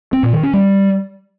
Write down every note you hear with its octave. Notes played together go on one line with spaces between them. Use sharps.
C4
A#2
D#3
C#4
G3